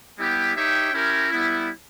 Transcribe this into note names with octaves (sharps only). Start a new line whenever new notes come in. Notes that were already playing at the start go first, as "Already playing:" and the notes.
G3 B3 E4 G4
D#4 G4 C#5 E5 G5
C#4 E4 G4 A#4
G3 B3 E4